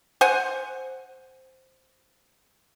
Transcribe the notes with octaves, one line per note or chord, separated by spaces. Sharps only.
C5 F#5 G#5